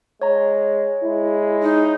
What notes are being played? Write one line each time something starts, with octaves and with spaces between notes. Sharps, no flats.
G#3 C#5 A#5
G#3 E4
D#4